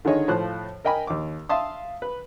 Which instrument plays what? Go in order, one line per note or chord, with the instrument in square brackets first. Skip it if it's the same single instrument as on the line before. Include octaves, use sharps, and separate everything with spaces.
[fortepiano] D3 D#3 G#4 C#5 D#5
A2 F3 F4 C5 F#6
A#4 D#5 G5 G#5 B5
D#2 D6
E5 F5 A5 C6 D#6
B4